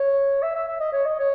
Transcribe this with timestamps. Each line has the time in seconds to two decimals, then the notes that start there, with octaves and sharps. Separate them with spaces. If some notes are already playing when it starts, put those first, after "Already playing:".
Already playing: C#5
0.42 E5
0.55 E5
0.68 E5
0.80 D#5
0.93 C#5
1.05 D#5
1.19 C#5